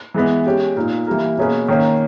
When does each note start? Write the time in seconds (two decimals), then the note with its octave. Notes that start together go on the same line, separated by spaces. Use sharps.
0.14 E3 G#3 B3
0.46 G#3 C#4 G4
0.76 A#2 A#3 D#4
1.07 E3 G3 A#3
1.37 B2 A#3 C#4 G#4 B4
1.68 D#3 A#3 C#4